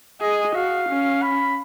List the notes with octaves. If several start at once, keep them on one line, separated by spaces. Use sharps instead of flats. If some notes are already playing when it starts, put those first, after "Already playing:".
G#4 D#5
F#4 F5
C#4
B5